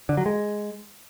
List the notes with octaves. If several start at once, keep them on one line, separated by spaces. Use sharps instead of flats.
D3
F#3
G#3